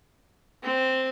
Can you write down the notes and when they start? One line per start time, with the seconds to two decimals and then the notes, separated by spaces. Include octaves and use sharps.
0.64 C4